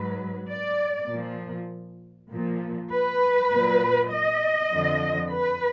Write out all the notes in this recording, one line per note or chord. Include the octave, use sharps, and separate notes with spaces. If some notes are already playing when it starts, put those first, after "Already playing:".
Already playing: G#2 F#3 B4
D5
A#2 F3
A#2 F3
B4
A#2 F#3
D#5
F2 D3 F3
B4